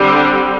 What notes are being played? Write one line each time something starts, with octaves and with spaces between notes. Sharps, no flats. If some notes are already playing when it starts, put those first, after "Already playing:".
Already playing: D3 G3 C4
D4